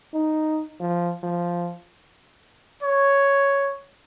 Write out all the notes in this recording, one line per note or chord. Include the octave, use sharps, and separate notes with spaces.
D#4
F3
F3
C#5